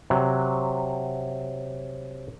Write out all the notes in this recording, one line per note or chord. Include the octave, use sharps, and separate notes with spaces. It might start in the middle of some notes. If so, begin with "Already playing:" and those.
C3 F#3